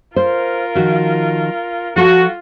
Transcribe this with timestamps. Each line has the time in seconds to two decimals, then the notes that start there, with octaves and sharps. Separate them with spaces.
0.16 F4 A#4 C5
0.75 D#3 F3 F#4
1.96 F3 F4 F#4 A4